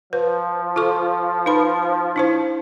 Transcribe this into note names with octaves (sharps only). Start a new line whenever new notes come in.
F3 B4
F4 A4 C#6
D#4 B4 B5
D4 E4 C5